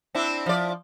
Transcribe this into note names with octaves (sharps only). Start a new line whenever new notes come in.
C4 D4 E4
F3 D5